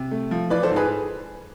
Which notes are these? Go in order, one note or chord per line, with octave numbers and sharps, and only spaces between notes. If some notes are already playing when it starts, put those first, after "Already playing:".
Already playing: C3
A3
F3
E3 B4 D5
A4 C5
G#2
G#4 B4